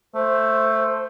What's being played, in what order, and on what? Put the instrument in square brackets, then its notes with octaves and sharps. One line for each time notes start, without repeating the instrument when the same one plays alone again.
[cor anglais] A3 [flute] C5